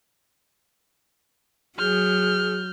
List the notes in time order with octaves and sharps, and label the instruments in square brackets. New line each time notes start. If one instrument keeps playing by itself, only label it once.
[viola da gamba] F#3 [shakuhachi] G#4 [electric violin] F6 G6